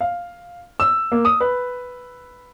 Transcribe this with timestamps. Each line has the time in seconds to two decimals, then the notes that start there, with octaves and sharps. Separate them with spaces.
0.01 F5
0.80 E6
1.12 A#3
1.25 D#6
1.40 B4